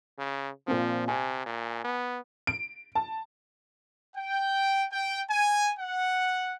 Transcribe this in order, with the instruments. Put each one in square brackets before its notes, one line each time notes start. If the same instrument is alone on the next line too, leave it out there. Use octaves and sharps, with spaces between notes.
[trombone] C#3
[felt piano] A#2 C4 [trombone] F3
[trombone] C3 [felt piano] G#5
[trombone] A#2
B3
[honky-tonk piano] D7
A5
[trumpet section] G5
G5
G#5
F#5